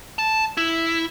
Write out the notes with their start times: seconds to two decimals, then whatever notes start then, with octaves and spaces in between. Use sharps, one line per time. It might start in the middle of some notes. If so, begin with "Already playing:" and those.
0.19 A5
0.57 E4